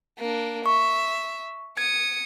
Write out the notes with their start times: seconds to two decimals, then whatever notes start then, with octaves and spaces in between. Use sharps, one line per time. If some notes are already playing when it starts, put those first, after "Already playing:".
0.19 A#3 D4
0.66 E5 C#6
1.77 D#6 G#6 C#7